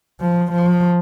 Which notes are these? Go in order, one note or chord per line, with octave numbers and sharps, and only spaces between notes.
F3
F3